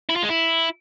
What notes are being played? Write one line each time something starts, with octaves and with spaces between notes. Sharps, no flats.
E4
F4
G#3
E4